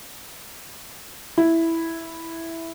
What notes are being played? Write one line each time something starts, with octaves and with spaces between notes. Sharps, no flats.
E4